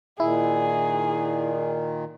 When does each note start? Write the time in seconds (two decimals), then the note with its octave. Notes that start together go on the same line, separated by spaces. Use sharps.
0.20 A#2 D#3 E4 G#4